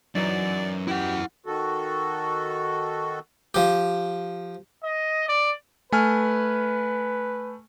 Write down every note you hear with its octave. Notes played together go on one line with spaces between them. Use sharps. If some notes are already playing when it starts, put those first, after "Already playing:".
F#2 E3 F#3 D#4 D5
E4 G4 F#5
D#3 F#4 A4
F3 G4
D#5
D5
A3 B4 G#5 F6